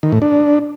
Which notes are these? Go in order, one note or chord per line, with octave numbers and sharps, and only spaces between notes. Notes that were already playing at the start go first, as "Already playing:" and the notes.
D#3
A2
D4